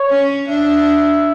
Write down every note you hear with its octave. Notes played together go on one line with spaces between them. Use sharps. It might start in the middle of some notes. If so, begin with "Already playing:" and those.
Already playing: C#5
C#4
D4 E5